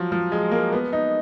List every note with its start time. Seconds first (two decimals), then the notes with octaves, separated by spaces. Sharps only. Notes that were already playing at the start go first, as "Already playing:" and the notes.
Already playing: F3 F#3
0.12 F3
0.32 G#3
0.51 A#3
0.72 B3
0.93 D#4